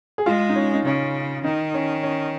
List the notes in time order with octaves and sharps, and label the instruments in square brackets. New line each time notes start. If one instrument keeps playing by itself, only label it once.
[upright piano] G#4
[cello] G#3 [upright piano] F4
[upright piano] D#4
C#4
D#4
[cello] C#3 [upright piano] C#4
[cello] D#3 [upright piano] D#4
[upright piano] C#4
C#4